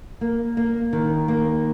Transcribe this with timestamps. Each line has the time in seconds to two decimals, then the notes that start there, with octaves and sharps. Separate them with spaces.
0.21 A#3
0.57 A#3
0.93 D#3
1.28 A#3